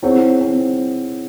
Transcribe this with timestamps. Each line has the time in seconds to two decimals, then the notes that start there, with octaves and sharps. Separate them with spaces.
0.03 C4 E4 G#4 C#5 F#5
0.41 C4